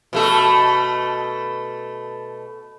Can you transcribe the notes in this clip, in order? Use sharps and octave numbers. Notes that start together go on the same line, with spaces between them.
B2 A3 A4